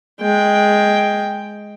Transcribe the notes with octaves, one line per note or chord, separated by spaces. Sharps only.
G#3 G5